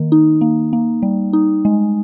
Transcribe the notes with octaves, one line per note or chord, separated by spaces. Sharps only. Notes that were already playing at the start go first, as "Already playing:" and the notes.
Already playing: D#3 A#3
D#4
A#3
A#3
G3
D#4
G#3